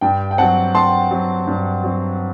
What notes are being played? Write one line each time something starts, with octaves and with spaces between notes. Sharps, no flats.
G2 G5
G5
F#3 C4 F#5 A5
G2 A5 C6
F#3 C4
G2
F#3 C4